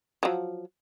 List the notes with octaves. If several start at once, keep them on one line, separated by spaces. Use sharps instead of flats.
F3 F#3